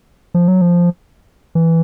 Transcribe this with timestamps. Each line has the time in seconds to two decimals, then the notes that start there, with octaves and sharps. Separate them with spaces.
0.34 F3
0.48 F#3
0.61 F3
1.55 E3